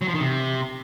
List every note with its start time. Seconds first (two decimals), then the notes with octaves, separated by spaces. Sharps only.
0.02 F#3
0.08 F3
0.14 D#3
0.21 C3